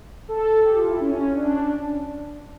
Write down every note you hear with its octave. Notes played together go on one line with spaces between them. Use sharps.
A4
G4
F4
E4
C#4
D4